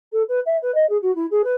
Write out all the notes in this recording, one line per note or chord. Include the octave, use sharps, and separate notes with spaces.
A4
B4
E5
B4
D#5
G#4
F#4
E4
G#4
B4